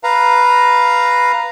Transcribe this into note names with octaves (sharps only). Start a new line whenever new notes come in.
B4 F5 A#5